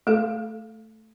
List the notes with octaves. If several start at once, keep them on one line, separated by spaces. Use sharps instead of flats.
A3 A4